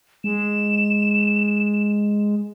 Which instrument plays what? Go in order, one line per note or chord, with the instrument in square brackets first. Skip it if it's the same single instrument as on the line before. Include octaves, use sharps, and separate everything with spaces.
[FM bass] G#3 [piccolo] E7